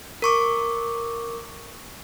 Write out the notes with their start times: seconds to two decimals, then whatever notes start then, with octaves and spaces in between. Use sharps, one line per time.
0.22 A#4 C#6 D6